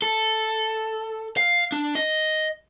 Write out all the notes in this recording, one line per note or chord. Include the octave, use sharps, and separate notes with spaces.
A4
F5
D4
D#5